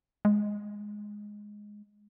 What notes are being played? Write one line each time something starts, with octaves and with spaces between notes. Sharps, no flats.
G#3